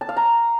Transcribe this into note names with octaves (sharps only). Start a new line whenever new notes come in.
A5
F5
A#5